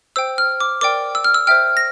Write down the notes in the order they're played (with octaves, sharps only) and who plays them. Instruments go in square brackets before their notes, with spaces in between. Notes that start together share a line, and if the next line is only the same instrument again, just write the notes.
[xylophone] C5 G5 E6
F6
D6
A#4 D5 G5 D6
E6
F6
E6
C5 E5 G5 F6
A#6